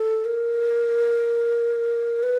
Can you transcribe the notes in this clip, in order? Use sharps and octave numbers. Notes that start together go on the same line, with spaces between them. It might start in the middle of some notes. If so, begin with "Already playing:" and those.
Already playing: A4
A#4
B4